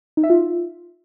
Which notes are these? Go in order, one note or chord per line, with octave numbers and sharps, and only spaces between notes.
D#4
E5
F4